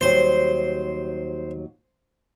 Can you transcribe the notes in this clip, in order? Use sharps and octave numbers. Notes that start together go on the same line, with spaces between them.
D#2 F#3 G3 C5